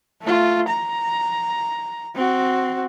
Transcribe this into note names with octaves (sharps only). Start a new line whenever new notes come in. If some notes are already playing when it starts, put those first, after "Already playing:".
A3 F4
A#5
C4 F#4